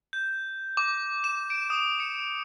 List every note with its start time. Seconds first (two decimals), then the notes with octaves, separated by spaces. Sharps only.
0.13 G6
0.77 D6
1.24 E7
1.50 D7
1.70 D#6
2.00 C#7